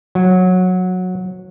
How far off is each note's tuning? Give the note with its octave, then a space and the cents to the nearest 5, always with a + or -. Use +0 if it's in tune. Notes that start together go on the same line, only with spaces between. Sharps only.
F#3 -15